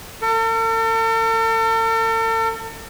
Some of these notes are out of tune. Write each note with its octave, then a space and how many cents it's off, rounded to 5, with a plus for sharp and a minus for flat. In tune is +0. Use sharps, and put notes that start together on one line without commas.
A4 +45